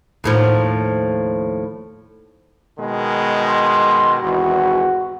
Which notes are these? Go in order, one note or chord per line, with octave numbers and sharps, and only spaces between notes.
D#2 A2 F3
B2 D#3 G#3
C6
G#1 E2 F#4